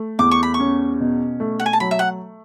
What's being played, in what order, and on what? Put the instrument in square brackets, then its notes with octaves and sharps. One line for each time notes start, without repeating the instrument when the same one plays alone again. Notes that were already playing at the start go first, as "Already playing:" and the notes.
Already playing: [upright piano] A3
[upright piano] E2 [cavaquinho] D6
[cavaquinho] C#6
B5
C#6
[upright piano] C#4
B2
A3
[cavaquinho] F#5
G#5
A5
[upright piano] F#3 [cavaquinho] B5
[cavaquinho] E5
F#5